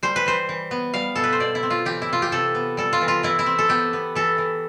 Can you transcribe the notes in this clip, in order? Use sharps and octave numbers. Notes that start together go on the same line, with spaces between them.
G3 C5
B4
E3 C5
E3
B3
G3 F5
B2 A4
B4
C5
B2 D5
E4
C4
F4
E3 G4
E4
C3 F4
G4
C3 A4
B3
G3 A4
F4
E3
F4
E3 E4
E4
C4
A4
B3 G4
B3
E3 A4
E3